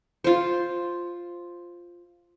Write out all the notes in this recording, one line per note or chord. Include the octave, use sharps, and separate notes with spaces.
F4 C5